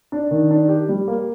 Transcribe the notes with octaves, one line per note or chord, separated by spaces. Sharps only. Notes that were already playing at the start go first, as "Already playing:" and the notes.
D4
D#3
D4
G4
G3
A#3